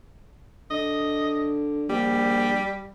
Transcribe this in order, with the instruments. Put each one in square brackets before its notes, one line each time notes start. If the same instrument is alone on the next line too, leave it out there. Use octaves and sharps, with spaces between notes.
[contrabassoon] D3 [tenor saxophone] D#5
[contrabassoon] A#1 [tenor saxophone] G3